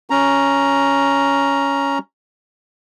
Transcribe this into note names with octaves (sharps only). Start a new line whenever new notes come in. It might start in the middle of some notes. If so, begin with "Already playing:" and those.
C#4 A#5